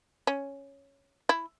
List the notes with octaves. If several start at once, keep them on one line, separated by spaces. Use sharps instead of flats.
C#4
E4